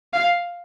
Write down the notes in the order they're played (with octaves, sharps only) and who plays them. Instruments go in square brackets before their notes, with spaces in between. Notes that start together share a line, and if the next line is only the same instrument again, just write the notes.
[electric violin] F5